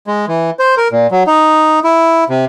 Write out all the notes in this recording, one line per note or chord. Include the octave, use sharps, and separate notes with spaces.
G#3
E3
C5
A#4
A#2
F#3
D#4
E4
C3